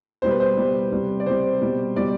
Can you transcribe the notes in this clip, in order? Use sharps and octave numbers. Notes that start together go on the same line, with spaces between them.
B2 G3 C5
B4
C5
B2 G3
C3 G3
D5
C3 G3 C5
B2 G3
B2 G3 D5